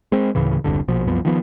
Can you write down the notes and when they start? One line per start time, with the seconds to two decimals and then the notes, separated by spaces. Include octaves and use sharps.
0.12 G#3 C4
0.35 D2 A2 C#3 E3
0.64 E1 C2 G2 D3
0.88 A#1 B2 F3
1.07 C2 F#2 F3 B3
1.25 D#3 F3 B3